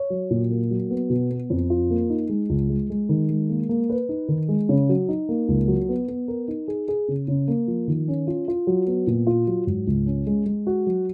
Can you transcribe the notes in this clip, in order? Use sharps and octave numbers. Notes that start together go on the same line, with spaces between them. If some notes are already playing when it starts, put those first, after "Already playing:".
Already playing: C#5
F#3
A#2
A#3
F#3
B3
B2
B3
F2
F4
A#3
D#4
G#3
C#2
G#3
G#3
D#3
G#3
A#3
A#3
B4
D#4
D#3
G#3
C#3
F#3
D#4
A#3
C#2
F#3
B3
B3
A#4
D#4
G#4
G#4
C#3
C#3
A#3
F3
D#3
C#4
F4
F4
F#3
B3
A#2
F4
F#3
G#2
C#2
C#4
G#3
G#3
F#4
F#3